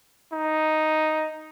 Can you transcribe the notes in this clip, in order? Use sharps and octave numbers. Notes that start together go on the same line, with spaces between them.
D#4